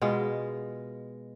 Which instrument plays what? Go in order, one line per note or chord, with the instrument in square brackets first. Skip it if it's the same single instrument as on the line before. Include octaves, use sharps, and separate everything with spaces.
[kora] B2 G#3 F4